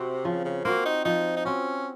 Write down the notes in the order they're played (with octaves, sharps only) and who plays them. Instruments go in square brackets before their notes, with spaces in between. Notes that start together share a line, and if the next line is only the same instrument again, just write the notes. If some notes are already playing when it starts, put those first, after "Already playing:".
Already playing: [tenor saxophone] C3 [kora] C4 F#4
[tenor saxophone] C#3 [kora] F3
[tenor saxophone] C#3
[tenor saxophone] A#3 [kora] C4 F#4
[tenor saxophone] D#4
[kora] F3 [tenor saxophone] D#4
[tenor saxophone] D#4
[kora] C4 F#4 [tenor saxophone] C#4